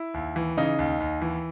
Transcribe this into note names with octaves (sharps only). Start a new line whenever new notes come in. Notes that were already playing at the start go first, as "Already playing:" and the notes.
Already playing: E4
D#2
E3
C#3 D#4
D#2
D#2
E3